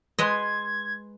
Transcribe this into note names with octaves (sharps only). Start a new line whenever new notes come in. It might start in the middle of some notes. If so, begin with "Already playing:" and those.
G#3 B4 D#5 C6 G#6